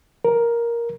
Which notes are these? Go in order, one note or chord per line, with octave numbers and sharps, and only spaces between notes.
A#4